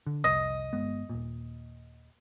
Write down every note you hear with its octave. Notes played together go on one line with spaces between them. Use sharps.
D3
C2 F2 D#5
G1 G#3 B3
D#1 A#2